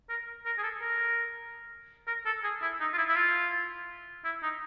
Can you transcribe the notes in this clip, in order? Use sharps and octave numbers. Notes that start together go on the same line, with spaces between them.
A#4
A#4
G#4
A4
A#4
A#4
A4
G#4
E4
D#4
F4
E4
E4
F4
E4
D#4